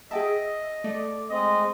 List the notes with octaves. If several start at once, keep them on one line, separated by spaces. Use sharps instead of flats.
G#4 D#5 E5 G5 A5
A3 D5
G#3 C4 D#5